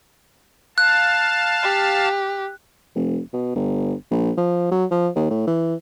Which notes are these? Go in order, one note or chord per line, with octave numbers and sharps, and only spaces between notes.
F5 A5 F#6
G4
F1
B2
G1
A#1
F3
F#3
F3
D#2
A2
E3